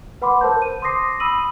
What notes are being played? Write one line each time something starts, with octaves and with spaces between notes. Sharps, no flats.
B4 F#5 B5 C6 D6
A#4 C5 A5 G6
D#7
C6 D6 D#6 A#6 C7
B5 D#6 E6 D#7 F#7